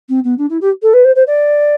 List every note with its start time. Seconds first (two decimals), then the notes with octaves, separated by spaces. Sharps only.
0.09 C4
0.24 B3
0.38 D4
0.49 E4
0.61 G4
0.82 A4
0.93 B4
1.04 C5
1.15 C5
1.27 D5